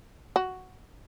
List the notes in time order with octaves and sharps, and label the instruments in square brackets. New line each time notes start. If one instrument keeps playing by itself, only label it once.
[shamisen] F#4